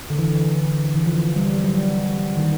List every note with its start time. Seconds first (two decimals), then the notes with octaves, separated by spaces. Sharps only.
0.10 D3
0.19 E3
0.96 E3
1.06 F3
1.36 G3
1.58 G3
1.64 F#3
2.37 D#3